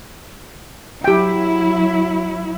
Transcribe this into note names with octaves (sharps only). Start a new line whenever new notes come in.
F#3 E4 G4 G5